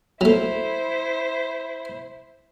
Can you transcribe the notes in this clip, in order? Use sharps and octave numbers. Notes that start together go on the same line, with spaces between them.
F#3 A3 E4 C5